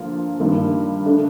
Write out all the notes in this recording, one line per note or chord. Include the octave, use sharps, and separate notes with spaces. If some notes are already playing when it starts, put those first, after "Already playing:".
Already playing: D3 F3 A#3 F4
G2 D#3 A#3 F4
D3 A3 D4